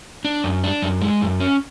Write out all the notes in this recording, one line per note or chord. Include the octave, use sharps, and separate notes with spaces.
D4
F#2
D4
F#2
G#3
F#2
C#4